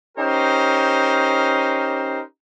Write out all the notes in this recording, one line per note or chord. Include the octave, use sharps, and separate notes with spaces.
C#4 D#4 G4 A#4 C5